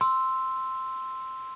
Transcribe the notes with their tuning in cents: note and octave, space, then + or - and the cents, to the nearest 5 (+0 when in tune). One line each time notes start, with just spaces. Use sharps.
C6 +0 E6 +0